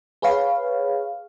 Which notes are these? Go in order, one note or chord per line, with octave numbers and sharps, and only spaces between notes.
G#4 B4 C#5 F5